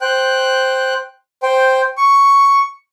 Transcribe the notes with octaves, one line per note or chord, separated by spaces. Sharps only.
C5 G5 F#6
C5 G5
C#6